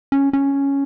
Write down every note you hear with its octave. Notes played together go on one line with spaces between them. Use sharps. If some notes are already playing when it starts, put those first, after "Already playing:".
C#4
C#4